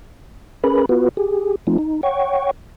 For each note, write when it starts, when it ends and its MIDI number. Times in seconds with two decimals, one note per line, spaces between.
0.64 0.86 61
0.64 0.86 68
0.64 0.86 70
0.64 0.86 71
0.64 0.86 83
0.89 1.09 59
0.89 1.09 65
0.89 1.09 66
0.89 1.09 71
1.17 1.55 67
1.17 1.55 68
1.67 1.78 53
1.67 1.78 57
1.67 1.78 60
1.67 1.78 63
1.67 1.78 65
1.78 2.01 63
2.03 2.51 73
2.03 2.51 78
2.03 2.51 79
2.03 2.51 85